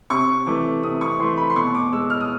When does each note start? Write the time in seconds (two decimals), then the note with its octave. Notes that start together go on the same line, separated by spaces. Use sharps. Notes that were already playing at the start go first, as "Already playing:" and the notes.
0.10 C3 C#6
0.47 E3 A3 D6
0.83 C3 D#6
1.01 C#6
1.19 E3 A3 C6
1.37 B5
1.50 C6
1.56 B2 C#6
1.75 D6
1.92 G#3 E6
2.10 F6
2.21 D#6